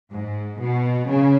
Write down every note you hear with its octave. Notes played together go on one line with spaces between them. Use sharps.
G#2
B2
C#3